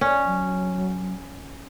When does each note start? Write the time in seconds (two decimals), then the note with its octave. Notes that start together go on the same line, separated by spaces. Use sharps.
0.01 C#4 D5
0.27 F#3